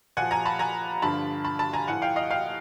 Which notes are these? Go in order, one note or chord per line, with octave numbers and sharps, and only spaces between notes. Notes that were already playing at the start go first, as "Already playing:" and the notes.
A#2 F3 F#5 G#5
G#5 A#5
A5 B5
G#5 A#5
G2 D3 F3 A5 B5
A5 B5
A5 B5
G#5 A#5
A2 F3 F#5 G#5
F5 G5
D#5 F5
F5 G5